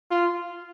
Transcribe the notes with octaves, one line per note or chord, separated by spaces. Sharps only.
F4